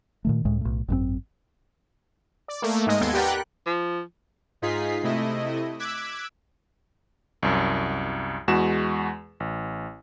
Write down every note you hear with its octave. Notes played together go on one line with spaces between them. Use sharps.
A#2 D#3 A3
C#2 A2 G#3
B1 A2
G#1 F#2 A2 C4
D5
A3 A#3
G#2 G#3 D#5
D#2 B3 A4 C6 G#6 D7
G4 A#4 B4 D5 F#5 G5
F#6
F3
G#2 D#4 F4 G#4 B6 C7
C3 A3 E4 D#5
D6 E6 F#6 G#6 B6
C2 F#2
E2 G#3 F#4 E7
A1